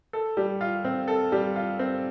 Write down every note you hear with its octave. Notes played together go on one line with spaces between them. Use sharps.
A4
G3
F4
C4
A4
G3
F4
C4